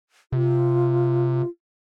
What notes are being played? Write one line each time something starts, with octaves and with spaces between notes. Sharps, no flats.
C3 F4